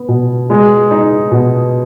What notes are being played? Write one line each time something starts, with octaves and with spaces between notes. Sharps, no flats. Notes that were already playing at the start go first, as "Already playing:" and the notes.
Already playing: B3
B2
G#3
D#4
B2